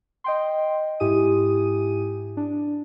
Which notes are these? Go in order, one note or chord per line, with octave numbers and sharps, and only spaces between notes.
D#5 G5 C6
G#2 E4 G4 G#5 D#6 D#7
D4